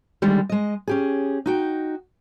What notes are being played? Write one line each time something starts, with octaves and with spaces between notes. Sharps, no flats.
D3 D#3 G3 G#3
G#3 D#5
C#4 G4 G#4
D#4 F#4 G5